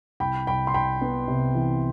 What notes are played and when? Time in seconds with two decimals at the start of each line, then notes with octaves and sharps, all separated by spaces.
0.20 C2 G5 B5
0.47 C2 G5 B5
0.67 C6
0.74 C2 G5 B5
1.01 B3
1.28 C3
1.55 E3